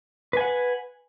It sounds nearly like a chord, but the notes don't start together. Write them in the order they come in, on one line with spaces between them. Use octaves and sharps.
B4 G#5 F#5